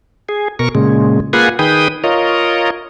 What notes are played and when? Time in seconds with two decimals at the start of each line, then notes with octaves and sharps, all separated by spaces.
0.29 G#4
0.59 B2 A#4 C#6
0.75 A#2 C#3 G#3
1.33 A#3 F4 G#4 B4 F#5 G#5
1.59 D#3 G#4 B4 G5 D#6
2.04 F4 A#4 C#5 D#5